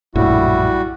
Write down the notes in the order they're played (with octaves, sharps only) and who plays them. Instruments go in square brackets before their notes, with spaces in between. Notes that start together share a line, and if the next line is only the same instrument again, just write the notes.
[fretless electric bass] A#1 F#2 A2 [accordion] G3 F#4 [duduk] E4